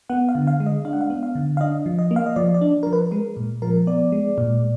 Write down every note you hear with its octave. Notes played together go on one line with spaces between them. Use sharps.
B3 F#5
F5
D3
F5
G#3
D#5
D4 F5
F#5
F5
B3
F5
D3
F5
D4 D#5
F3
D#5
A#3
F5
D#5
F3 D5
D5
D4
F3 A#4
B4
G#3 A#4
A#2
F3 A#4
B3 D5
G#3
A#2